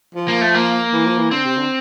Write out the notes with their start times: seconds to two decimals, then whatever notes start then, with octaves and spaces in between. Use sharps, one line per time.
0.15 F3
0.28 A#3
0.41 A3
0.54 A#3
0.93 E3
1.05 F3
1.17 E3
1.31 D3 C4
1.44 C3
1.57 D3